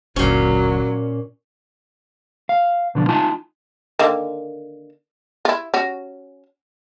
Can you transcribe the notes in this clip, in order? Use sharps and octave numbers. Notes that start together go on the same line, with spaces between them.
F#1 D2 A#2 F#3 C#4
F5
B2 D3 F3
D#4 F4 G#5 A5
D3 D#3 A#3
E4 F4
C#4 F#4